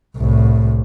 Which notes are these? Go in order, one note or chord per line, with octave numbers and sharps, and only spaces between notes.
C2 A2